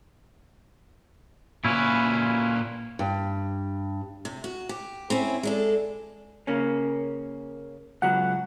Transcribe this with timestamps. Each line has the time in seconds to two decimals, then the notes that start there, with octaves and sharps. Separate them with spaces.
1.65 A#2 C#4 E4 B4
2.99 G2
4.25 C3
4.44 F#4
4.69 G4
5.10 C4 C#4 E4
5.43 G#3 D4 A4
6.47 C#3 A#3 C#4
8.02 C#2 F#3 B3 F#5